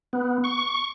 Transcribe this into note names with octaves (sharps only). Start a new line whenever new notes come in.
B3
C#6